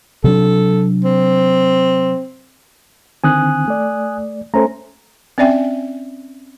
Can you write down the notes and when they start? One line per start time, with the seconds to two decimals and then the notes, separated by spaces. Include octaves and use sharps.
0.24 C3 F#3 D4 A4
1.04 C4
3.24 D3 D#3 C4 G#5 D#6 F#6
3.68 A3 D5
4.54 A3 C#4 A4 C5 A#5
5.38 C4 C#4 D5 E5 G5